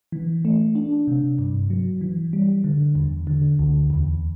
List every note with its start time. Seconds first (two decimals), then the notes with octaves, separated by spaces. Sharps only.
0.12 E3
0.45 A3
0.75 D4
1.07 C3
1.39 G2
1.70 F#3
2.01 E3
2.33 G3
2.64 D3
2.95 E2
3.27 D3
3.59 D2
3.90 E2